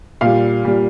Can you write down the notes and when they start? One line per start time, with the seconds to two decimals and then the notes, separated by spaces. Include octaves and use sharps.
0.21 A#2 G3 F5
0.65 A#2 G3